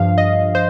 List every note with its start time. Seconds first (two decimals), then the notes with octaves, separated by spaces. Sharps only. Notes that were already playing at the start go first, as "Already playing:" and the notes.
Already playing: G2 F3 F5
0.18 D#5
0.55 C5